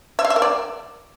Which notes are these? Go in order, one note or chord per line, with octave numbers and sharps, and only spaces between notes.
E5
F5
E5
A#4
D5